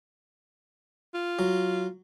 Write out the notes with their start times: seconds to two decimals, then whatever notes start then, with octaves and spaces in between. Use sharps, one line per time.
1.14 F4
1.39 F#3